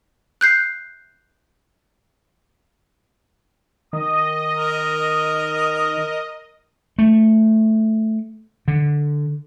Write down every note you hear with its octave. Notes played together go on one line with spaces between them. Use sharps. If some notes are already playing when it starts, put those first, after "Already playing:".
F#6 G6 C7
D#3 D#5 D#6
A#4
A3
D3